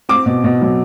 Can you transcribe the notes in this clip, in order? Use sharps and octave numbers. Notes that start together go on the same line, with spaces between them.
C4 D6
B2
B2
F#3